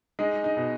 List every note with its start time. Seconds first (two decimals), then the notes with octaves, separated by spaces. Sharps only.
0.19 G#3 D#4
0.44 D#4
0.57 B2